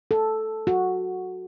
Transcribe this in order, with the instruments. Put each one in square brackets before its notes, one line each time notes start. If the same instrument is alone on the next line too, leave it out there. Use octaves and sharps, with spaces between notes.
[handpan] A4
F#4